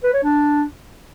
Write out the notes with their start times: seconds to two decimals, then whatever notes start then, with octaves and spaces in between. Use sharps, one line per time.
0.04 B4
0.14 C#5
0.24 D4